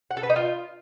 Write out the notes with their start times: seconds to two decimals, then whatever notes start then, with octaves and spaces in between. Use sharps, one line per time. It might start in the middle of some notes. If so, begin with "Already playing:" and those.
0.11 F#5
0.17 A4
0.23 B4
0.30 D#4
0.36 F4